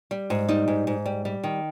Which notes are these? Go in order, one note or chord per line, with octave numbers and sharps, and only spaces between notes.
G3
G#2
G3 D#4
G#2
G#2
G3
G3
D#3